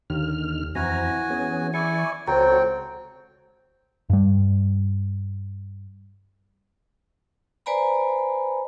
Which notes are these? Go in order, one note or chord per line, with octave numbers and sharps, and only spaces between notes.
D#2 D3 D#3 F6
F2 E3 C4 F#4 G#5 A#5
B3 C#4 G#4
E4 D5 G#5 C#6
C#2 C4 F#4 A4 C5 C#5 G5 A#5
G2 G3
B4 C5 D5 G#5 A#5 B5